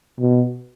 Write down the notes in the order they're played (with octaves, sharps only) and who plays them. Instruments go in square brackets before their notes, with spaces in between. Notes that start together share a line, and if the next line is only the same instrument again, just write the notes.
[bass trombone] B2